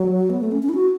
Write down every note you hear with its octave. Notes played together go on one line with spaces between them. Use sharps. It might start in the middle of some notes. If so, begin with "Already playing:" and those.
Already playing: F#3
B3
A3
C#4
C#4
E4
F#4